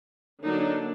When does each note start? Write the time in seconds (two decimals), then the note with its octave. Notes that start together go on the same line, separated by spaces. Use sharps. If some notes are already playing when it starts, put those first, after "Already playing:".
0.45 D3 F#3 A#3 D4 D#4